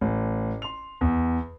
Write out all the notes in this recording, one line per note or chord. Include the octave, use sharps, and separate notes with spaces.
A1
C6 F7
E2